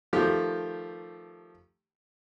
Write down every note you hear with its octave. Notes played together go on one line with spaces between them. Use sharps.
D#3 F3 A3 G4